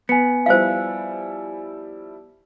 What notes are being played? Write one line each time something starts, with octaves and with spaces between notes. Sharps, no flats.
B3 G#5 C#7
F3 G3 E4 C5 F5